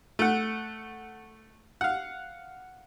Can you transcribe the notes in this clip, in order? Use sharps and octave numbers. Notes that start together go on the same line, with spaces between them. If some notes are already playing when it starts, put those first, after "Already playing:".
A3 F#5
F5 F#5